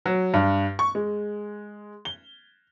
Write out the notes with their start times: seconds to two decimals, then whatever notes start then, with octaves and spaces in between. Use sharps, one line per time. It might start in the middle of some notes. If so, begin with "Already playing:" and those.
0.06 F#3
0.34 G2
0.79 C#6
0.95 G#3
2.05 G7